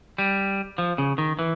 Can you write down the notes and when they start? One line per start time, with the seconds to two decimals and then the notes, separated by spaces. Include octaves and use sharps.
0.18 G3
0.78 F3
0.98 C#3
1.18 D#3
1.39 E3